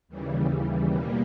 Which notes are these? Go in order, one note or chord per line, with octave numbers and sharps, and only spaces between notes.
D#2 C#3 E3 G3
B2 G3 A#3